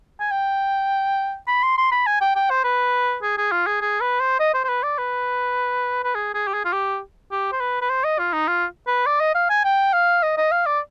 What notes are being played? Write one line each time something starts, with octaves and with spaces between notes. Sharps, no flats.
G#5
G5
B5
C6
C6
B5
G#5
G5
G5
C5
B4
G#4
G#4
F4
G#4
G#4
B4
C5
D#5
C5
C5
B4
D5
B4
B4
G#4
G#4
G4
G#4
F4
G4
G4
C5
B4
B4
C5
D#5
F4
D#4
F4
B4
D5
D#5
F5
G#5
G5
F5
D#5
D#5
F5
D5